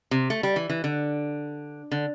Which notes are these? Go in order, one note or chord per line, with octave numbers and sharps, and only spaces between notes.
C3
A3
G3
E3
E3
D3
D3